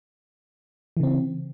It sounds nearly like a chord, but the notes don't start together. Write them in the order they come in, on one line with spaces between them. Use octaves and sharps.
E3 C#3 C4